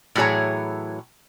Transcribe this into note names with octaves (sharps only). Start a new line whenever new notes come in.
A2 E3 F#3 G#4 C#5 A#5